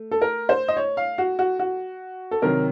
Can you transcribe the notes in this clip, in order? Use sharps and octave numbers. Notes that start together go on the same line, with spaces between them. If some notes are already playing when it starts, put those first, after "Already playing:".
Already playing: A3
A4
A#4
C5
D#5
C#5
F5
F#4
F#4
F#4
A4
C3 D#3 F#3 A#4